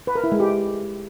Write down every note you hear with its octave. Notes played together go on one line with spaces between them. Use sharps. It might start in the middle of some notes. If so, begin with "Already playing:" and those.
B4
A#4
E4
G#3
G4